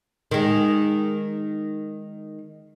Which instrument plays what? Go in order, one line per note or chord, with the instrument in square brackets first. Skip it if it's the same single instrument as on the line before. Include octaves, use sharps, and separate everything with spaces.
[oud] D#3 G#3